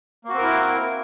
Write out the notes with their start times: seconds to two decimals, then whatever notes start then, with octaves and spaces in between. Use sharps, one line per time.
0.25 A#3
0.29 F#4
0.33 C4
0.38 A#4
0.42 E4